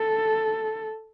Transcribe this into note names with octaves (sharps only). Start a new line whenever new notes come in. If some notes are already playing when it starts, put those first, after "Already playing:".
Already playing: A4